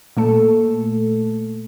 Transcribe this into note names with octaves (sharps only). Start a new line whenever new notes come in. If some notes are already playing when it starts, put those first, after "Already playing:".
A#2 A3 A4